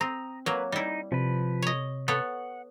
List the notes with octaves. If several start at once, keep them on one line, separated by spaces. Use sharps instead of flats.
C4 A#5 D#6
F#3 A#3 B4
G3 D#4 E4
C3 F3 B4
C#5 D#5
B3 A4 C#5 F#5